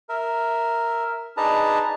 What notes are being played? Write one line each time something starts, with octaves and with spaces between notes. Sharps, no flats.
A#4 E5
D4 D#4 G#4 B4 A5 A#5